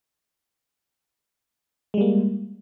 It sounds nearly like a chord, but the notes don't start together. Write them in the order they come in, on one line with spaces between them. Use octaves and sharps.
G#3 G3 A#3